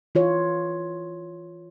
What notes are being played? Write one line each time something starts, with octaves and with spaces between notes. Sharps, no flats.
E3 F4 C#5